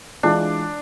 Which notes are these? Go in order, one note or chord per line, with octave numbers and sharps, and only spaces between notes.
E3 G#3 D4 F4